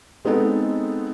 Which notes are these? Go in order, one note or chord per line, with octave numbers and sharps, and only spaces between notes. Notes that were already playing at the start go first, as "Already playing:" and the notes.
G#3 B3 C4 D#4 A4